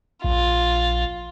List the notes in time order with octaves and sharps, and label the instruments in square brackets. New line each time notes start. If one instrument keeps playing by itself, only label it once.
[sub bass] A#1 [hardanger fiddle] F4